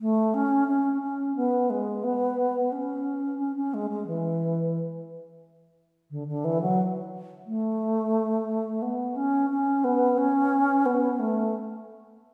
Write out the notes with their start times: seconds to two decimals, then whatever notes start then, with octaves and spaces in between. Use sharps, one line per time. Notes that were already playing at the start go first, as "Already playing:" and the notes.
0.01 A3
0.34 C#4
0.68 C#4
1.02 C#4
1.36 B3
1.70 G#3
2.04 B3
2.72 C#4
3.39 C#4
3.56 C#4
3.74 G#3
3.90 G#3
4.07 E3
6.11 D3
6.28 D3
6.44 E3
6.61 F#3
7.46 A3
8.82 B3
9.16 C#4
9.50 C#4
9.84 B3
10.18 C#4
10.86 B3
11.19 A3